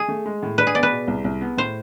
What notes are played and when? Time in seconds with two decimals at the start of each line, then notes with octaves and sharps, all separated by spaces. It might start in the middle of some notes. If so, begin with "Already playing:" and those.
Already playing: G#4
0.08 A3
0.26 G#3
0.43 A2
0.58 D4 B4
0.67 G#4
0.75 B3 D5
0.83 B4
0.92 B2
1.08 C2
1.24 C2
1.41 B3
1.57 A2 C5